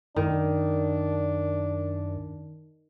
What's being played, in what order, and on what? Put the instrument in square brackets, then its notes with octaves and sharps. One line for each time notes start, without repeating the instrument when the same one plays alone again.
[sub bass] F#2 [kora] D#3 [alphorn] D4